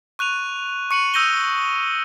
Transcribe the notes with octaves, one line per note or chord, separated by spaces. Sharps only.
C#6 F#6 D#7 F7
C#6 C#7 D#7 F#7
D#6 E6 G6 A#6 D#7 G7